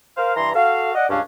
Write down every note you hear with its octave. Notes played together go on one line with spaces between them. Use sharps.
A#4 C5 F5
G2 E3 A#5 C6
F#4 A4 F5
D5 D#5 F#5
C#2 G2 C#4 D4 F5